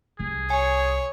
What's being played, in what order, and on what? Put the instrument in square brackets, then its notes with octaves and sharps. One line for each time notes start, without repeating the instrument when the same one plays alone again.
[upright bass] C2 [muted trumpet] G#4
[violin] C#5 [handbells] G#5